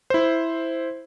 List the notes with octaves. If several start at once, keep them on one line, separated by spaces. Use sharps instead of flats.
E4 C5